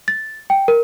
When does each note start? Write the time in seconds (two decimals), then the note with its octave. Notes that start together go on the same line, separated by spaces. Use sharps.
0.08 A6
0.50 G5
0.68 A#4